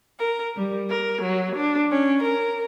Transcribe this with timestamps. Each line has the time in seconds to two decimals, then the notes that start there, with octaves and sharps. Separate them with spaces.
0.18 A#4
0.57 G3
0.89 A#4
1.22 F#3
1.56 D4
1.90 C#4
2.22 A#4